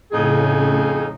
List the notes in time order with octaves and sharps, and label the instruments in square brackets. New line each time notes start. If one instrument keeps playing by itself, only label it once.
[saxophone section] F2 D#4 G#4 [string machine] A2 C#3